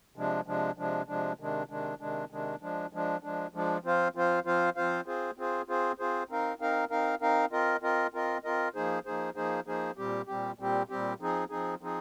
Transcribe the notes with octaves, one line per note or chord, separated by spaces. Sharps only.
C3 F3 G#3 D4
C3 F3 G#3 D4
C3 F3 G#3 D4
C3 F3 G#3 D4
C3 D#3 G#3 D4
C3 D#3 G#3 D4
C3 D#3 G#3 D4
C3 D#3 G#3 D4
F3 G#3 D4
F3 G#3 D4
F3 G#3 D4
F3 G#3 D4
F3 C4 F4 C5 F5
F3 C4 F4 C5 F5
F3 C4 F4 C5 F5
F3 C4 F4 C5 F5
C4 F4 G#4 C5
C4 F4 G#4 C5
C4 F4 G#4 C5
C4 F4 G#4 C5
C4 D#4 A#4 F5
C4 D#4 A#4 F5
C4 D#4 A#4 F5
C4 D#4 A#4 F5
C4 F4 A#4 D#5
C4 F4 A#4 D#5
C4 F4 A#4 D#5
C4 F4 A#4 D#5
F3 A#3 D#4 G#4 C5
F3 A#3 D#4 G#4 C5
F3 A#3 D#4 G#4 C5
F3 A#3 D#4 G#4 C5
A#2 G3 C4 G4
A#2 G3 C4 G4
A#2 G3 C4 G4
A#2 G3 C4 G4
F3 C4 D#4 G#4
F3 C4 D#4 G#4
F3 C4 D#4 G#4